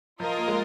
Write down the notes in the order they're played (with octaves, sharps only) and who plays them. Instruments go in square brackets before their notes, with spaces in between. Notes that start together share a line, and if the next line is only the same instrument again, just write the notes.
[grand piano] F3 [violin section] F4 A#4 D#5
[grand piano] A#3
G#3